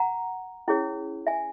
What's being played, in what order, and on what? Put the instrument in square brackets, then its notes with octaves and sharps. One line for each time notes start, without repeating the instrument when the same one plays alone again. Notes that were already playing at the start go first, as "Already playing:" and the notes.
Already playing: [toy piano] F#5 A#5
C#4 E4 G#4 C#5
E5 G#5